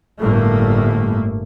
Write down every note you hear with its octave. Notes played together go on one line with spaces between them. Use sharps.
G1 A2 A3 A#3